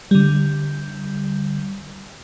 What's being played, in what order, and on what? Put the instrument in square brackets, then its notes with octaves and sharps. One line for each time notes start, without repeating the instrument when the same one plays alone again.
[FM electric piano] D3 G3